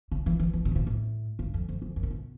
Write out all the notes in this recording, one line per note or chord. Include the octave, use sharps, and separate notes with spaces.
C#3
E3
E3
E3
B2
A2
A#2
A2
G2
F2
F2
F2
F#2
A#2
B2